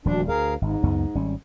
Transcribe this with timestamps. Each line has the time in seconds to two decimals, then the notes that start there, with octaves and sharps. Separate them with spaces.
0.05 D#1 D2 F3 G3 D4
0.28 D2 G#4 A#4 F5
0.62 G#1 G#2
0.83 C#2 F#2 B3
1.15 G#1 G3 C#4